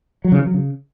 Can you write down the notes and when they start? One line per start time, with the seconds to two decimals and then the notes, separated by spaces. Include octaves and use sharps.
0.24 F#3
0.32 C#3
0.39 E3
0.47 F#3
0.54 C#3